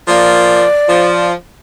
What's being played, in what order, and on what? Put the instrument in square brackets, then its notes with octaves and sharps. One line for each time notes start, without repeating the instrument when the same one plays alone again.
[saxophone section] F3 A#3 [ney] D5
[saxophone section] F3